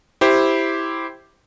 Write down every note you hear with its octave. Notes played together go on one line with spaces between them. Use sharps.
E4 G4 C5